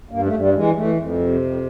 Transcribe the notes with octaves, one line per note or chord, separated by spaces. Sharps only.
G2 A#3
A3
G2
G3
E3 G#3
E3 A3
F2
C3
F2